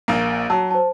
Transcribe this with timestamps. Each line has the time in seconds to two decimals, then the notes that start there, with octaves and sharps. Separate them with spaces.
0.08 A#1 A#3
0.50 F#3 A5
0.71 C5 A5